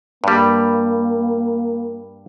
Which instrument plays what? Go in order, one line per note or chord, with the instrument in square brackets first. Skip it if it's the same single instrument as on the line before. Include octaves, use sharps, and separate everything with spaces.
[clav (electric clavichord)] G2 G3 [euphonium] A#3